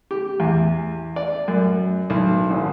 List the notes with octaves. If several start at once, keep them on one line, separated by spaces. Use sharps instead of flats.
G4
E2
D5
F#2
B1
G#1